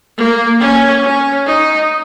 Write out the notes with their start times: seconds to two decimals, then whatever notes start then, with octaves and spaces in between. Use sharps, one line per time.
0.17 A#3
0.60 C#4
1.03 C#4
1.46 D#4